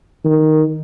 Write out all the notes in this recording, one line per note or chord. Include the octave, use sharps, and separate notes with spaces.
D#3